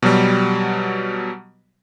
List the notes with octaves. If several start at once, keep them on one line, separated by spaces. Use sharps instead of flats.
B2 F#3 G3